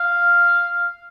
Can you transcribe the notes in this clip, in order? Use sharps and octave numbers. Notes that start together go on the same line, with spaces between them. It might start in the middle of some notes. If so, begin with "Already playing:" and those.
Already playing: F5